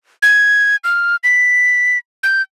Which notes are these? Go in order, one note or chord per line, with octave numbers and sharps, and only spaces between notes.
G#6
F6
B6
G6